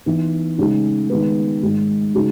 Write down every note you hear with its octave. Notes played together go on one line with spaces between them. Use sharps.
E3 B3 D#4
C#3 G#3 D#4
D#3 G#3 B3
G#2 D#3 G#3
C#3 G#3 D#4 F#4